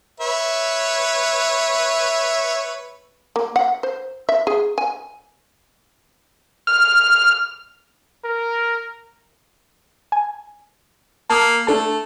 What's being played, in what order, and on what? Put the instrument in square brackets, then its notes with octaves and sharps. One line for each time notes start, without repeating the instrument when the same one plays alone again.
[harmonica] B4 C#5 E5
[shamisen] A#3
F#5
C5
E5
G#4
G#5
[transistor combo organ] F6
[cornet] A#4
[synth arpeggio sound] G#5
[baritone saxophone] A#3 [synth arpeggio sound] A5 D#6
[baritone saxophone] A3 [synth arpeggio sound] D4 A4 A5